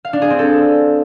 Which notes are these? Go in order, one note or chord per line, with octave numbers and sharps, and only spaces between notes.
F5
D4
G#4
C4
A4